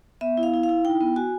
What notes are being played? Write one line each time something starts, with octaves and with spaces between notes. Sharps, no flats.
B3 E5
E4
F5
E4
F5
E4
D#4 G5
B3
F#4 G#5